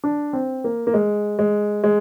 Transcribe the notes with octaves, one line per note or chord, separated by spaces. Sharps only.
D4
C4
A#3
A#3
G#3
G#3
G#3